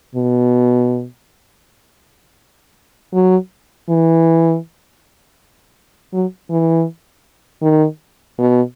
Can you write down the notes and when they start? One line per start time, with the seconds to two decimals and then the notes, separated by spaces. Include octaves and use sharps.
0.15 B2
3.14 F#3
3.89 E3
6.13 F#3
6.50 E3
7.62 D#3
8.38 B2